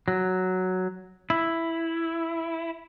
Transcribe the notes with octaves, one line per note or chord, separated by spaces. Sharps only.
F#3
E4